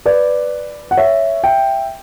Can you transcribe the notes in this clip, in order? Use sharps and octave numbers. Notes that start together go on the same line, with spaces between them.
B4 D5
F#5
C#5 E5
E5 G5